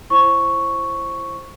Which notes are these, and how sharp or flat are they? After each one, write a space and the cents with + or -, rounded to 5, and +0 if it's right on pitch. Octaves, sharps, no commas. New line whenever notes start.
E4 +25 C5 +20 C#6 +0